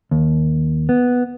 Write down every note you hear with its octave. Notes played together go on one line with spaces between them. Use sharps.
D#2
B3